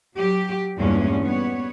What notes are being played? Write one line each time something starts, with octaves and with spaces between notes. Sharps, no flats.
F#3 G4
E2 G2 A#2 G#3 C#4
G3 B3 C#5